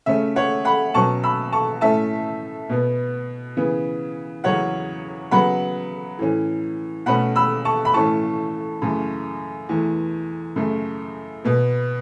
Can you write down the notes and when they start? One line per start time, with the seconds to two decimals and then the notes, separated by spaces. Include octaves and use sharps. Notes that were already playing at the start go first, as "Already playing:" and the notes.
0.06 C#3 A3 C#4 E5
0.36 C#5 F#5
0.65 F#5 B5
0.94 B2 F#3 C#4 A5 C#6
1.23 B5 E6
1.52 A5 C#6
1.81 A2 A3 C#4 E5 A5
2.70 B2 B3
3.57 C#3 E3 B3
4.44 E2 C#3 F#3 C#4 C#5 F#5
5.31 C#3 F#3 B3 F#5 B5
6.19 A2 E3 C#4
7.06 B2 A3 C#4 F#5 B5
7.36 B5 E6
7.65 A5 C#6
7.85 B5
7.94 A2 E3 A3 C#4 A5 C#6
8.82 F#2 C#3 E3 A3
9.69 E2 E3 A3
10.56 F#2 C#3 A3
11.44 B2 B3